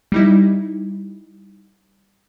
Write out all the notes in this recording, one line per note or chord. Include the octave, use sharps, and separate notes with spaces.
G3 D#4 E4